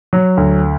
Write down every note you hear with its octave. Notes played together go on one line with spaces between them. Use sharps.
F#3
D2